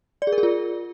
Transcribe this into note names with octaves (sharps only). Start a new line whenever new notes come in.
D5
G#4
A#4
G#4
F4